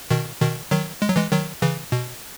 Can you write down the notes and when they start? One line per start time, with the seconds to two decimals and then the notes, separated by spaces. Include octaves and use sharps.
0.11 B2 D#3
0.41 B2 D#3
0.71 D#3 F#3
1.02 G#3
1.09 F#3
1.16 E3 G#3
1.32 D#3 F#3
1.62 C#3 E3
1.92 B2